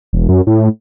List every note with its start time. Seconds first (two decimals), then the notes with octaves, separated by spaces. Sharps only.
0.13 E1
0.29 F#2
0.47 A2